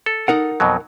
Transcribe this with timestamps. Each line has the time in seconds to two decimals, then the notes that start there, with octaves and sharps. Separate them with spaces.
0.06 A4
0.28 D#4 A#4 F#5
0.60 F2 B2 F#3